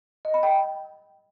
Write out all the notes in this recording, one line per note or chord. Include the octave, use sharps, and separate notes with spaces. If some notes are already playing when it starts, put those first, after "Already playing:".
D#5
B5
G5